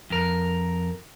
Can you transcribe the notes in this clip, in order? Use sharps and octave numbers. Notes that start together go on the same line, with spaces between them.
F2 A#4